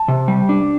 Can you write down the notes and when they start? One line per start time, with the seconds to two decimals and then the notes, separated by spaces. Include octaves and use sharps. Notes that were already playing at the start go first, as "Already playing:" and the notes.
Already playing: A5
0.08 C3
0.28 G3
0.49 D4